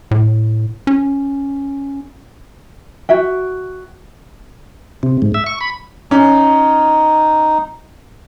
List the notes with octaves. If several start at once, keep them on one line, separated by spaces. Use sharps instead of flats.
A2
C#4
F#4 E5 G5
C3
G#2
E5
C#6
B5
C#4 D#4